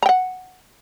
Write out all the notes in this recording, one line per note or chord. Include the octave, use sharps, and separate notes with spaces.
F#5 G5 A#5